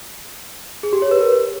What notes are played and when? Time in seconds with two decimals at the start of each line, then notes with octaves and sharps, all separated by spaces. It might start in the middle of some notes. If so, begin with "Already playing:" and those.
0.83 G#4
0.93 G4
1.02 C#5
1.11 B4
1.21 A#4